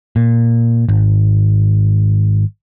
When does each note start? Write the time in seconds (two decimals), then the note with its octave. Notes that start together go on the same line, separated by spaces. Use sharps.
0.16 A#2
0.89 G#1